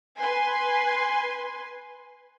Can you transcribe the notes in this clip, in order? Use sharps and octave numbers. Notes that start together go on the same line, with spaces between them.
B4 G#5 C6